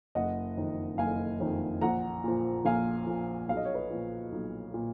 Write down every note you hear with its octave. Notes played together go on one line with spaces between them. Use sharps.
F#1 D#5 F#5
F2 D#3
F#1 F5 G#5
F2 D#3
A#1 F#5 A#5
A#2 F3
A#1 F5 G#5
A#2 F3
B1 F5
D#5
C#5
B4 D#5
A#2 F3
B1
A#2